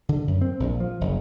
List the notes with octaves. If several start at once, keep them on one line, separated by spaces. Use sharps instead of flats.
D3
F#2
C4
A#1
F3
F#1